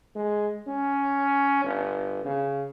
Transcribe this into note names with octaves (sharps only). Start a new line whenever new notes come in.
G#3
C#4
G1
C#3